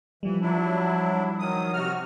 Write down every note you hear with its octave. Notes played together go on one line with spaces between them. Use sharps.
E3 F3 G3
F#3 D4 E4
D#3 F#3 D#6
C3 F#4 F6